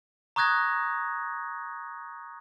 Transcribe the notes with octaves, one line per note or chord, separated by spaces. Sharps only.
A#5 C#6 D#6 F#6 G#6 A#6